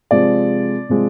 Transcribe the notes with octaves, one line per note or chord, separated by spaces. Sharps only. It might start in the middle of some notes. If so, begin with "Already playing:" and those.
C3 F3 G#3 D5
C3 F3 G#3